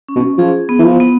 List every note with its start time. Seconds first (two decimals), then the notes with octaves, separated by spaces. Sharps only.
0.09 C#4
0.16 B2
0.38 F3 G#4
0.69 B3
0.79 E3
0.84 F3
1.00 B3